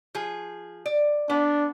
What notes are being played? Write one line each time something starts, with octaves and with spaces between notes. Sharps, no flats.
F3 G#4
D5
B3 D4